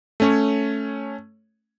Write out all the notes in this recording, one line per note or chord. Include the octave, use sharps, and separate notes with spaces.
A3 C#4 C#5